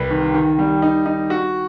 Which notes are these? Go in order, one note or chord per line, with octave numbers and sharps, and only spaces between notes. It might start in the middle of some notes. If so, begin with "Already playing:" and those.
Already playing: C2 B4
D#3
D#3
G3
D#4
D#4
F#4